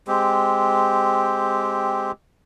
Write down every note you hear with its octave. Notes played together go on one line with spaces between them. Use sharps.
G#3 C4 G4